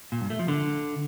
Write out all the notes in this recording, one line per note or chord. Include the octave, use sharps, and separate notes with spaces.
A#2
G2
A3
F3
D3